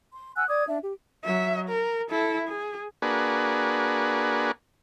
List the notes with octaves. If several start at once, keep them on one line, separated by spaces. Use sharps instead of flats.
C6
F#5 G#5 E6 F#6
D5 D6 D#6 G#6
D4 E5
G4
F#3 E5
A#4
E4 A4
G#4
A#3 D4 F#4 G#4 B4